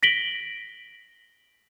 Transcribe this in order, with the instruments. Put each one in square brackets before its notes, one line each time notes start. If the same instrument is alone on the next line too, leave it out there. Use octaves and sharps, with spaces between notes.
[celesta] A#6 B6 D7 F#7 G7